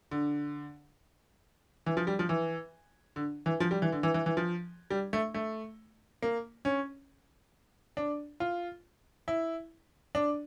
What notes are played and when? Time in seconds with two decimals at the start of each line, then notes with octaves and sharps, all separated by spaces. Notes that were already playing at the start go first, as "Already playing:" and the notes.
0.11 D3
1.86 E3
1.97 F3
2.07 G3
2.19 F3
2.29 E3
3.16 D3
3.46 E3
3.60 F3
3.71 G3
3.82 E3
3.92 D3
4.03 E3
4.14 E3
4.26 E3
4.37 F3
4.91 G3
5.13 A3
5.34 A3
6.22 A#3
6.65 C#4
7.97 D4
8.40 F4
9.28 E4
10.15 D4